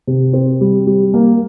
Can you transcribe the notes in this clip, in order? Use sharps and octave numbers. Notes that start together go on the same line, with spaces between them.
C3
C4
G3
G3
A#3